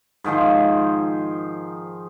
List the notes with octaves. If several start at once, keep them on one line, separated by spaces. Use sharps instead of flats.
G#2 D#3 F3 C5